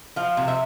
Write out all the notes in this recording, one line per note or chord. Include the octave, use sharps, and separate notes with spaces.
F3 F5
C3
E5